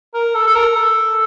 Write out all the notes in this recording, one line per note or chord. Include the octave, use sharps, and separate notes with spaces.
A#4
A4
A4
A#4
A4